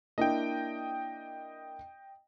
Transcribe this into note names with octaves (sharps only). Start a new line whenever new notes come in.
A#3 D4 E4 D#5 G5